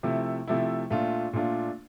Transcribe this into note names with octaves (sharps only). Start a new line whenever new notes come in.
C3 F3 A3 E4
C3 F3 A3 E4
A#2 A3 D4 F4
A#2 A3 D4 F4